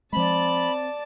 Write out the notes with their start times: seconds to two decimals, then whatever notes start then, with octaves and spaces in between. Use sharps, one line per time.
0.13 F3 G#3 C4 D5 A5 B5